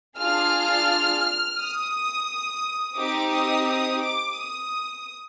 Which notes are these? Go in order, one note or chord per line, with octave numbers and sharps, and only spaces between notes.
D4 F4 G#4 F6
D#6
C4 D#4 G4 D6
D#6
D#6
D6
D#6